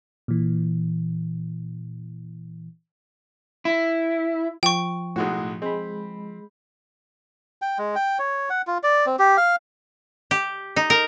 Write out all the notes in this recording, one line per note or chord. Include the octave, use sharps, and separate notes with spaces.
A#2 E3
E4
F3 G5 C#6
B1 A2 G#3 F#4
G#3 C4 B5
G5
G#3
G5
C#5
F#5
F4
D5
C4
G4
F5
G4
D#4
A#4